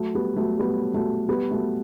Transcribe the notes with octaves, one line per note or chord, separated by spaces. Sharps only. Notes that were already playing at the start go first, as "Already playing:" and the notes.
Already playing: F#3 A3
G3 B3
F#3 A3
G3 B3
F#3 A3
G3 B3
F#3 A3